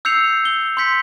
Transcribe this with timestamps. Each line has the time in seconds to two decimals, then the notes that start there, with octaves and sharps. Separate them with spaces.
0.05 E6 G6 C7 C#7 F7
0.45 G7
0.77 C6 E6 G6 B6 C#7